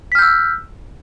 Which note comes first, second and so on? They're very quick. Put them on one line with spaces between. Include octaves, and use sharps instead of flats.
B6 F6 G6 E6